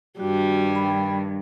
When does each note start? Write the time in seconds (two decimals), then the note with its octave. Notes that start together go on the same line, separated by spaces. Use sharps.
0.20 G2 D#3 G3 D4 F#4
0.75 G5 B5